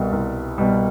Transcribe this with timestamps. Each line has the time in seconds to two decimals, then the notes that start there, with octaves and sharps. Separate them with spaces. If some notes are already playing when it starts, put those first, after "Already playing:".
Already playing: C2 B2 G3
0.12 C2
0.58 B2 G3